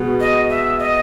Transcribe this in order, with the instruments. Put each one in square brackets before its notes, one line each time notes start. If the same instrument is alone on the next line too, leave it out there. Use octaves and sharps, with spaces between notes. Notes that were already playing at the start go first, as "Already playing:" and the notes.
Already playing: [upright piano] B2 G#3 B3 F#4
[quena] D#5
E5
D#5